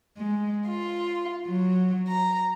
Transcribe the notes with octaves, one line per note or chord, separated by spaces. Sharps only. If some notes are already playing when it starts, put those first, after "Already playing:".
G#3
F4
F#3
A#5